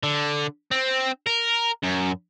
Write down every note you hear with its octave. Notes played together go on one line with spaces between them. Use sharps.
D3
C4
A#4
F#2